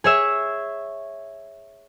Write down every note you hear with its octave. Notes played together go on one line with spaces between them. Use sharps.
G#4 C#5 E5